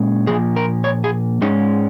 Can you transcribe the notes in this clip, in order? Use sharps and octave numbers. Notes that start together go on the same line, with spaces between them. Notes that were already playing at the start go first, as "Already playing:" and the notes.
Already playing: A#2 G#3 C#4
A#2 F3 A#3 G#4
A#4
C#5
G#4
G#2 G#3 C#4 D#4